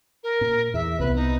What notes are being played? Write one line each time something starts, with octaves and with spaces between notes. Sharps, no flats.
A#4
A#2
E2 E5
C2 B3 B4
D#4